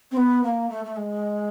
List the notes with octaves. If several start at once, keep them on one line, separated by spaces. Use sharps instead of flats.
C4
B3
A#3
A3
A3
G#3